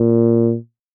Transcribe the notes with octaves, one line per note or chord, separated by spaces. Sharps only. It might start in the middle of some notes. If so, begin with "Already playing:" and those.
Already playing: A#2